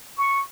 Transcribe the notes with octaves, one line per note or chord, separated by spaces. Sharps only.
C#6